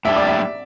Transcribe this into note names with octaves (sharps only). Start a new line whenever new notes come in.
A2 G3 D4 E5
D5
E5